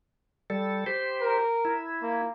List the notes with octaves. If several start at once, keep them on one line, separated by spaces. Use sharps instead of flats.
G3 A4
G4 C5
A#4
E4
A#3